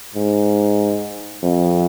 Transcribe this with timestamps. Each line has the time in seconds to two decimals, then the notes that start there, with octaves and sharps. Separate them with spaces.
0.15 G#2
1.43 F2